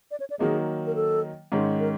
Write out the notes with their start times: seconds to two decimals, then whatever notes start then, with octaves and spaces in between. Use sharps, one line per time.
0.11 D5
0.20 C#5
0.30 D5
0.39 D#3 F#3 A#3 D#4 G#4
0.86 A#4
0.95 A4
1.52 G#2 D#3 G#3 C#4
1.80 A#4